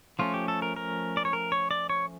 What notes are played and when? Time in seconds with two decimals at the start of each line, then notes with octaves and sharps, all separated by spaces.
0.19 F3 A3 C#4 F4
0.34 G4
0.48 A4
0.62 A#4
0.76 A#4
1.17 D5
1.25 C#5
1.33 A#4
1.52 C#5
1.71 D5
1.90 C#5